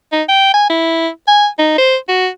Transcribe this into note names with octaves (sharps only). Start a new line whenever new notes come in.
D#4
G5
G#5
E4
G#5
D#4
C5
F#4